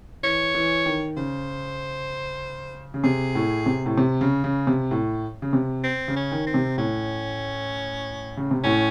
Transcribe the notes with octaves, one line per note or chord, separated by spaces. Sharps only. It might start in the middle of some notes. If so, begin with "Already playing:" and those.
E3 C#5
E3
D#3
C#3 C5
C#3
C3 G#4
A2
C3
A2
C3
C#3
C#3
C3
A2
C#3
C3
C4
C#3
C#4
D#3
C4
C3
A2 C#4
C#3
C3
A2 C#4